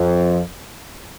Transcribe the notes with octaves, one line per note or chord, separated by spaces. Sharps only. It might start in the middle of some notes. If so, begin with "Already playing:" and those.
Already playing: F2